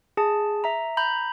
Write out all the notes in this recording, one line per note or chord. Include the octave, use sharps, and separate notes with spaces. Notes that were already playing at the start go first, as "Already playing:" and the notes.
G#4 A5
E5 A#5
A#5 B5 G6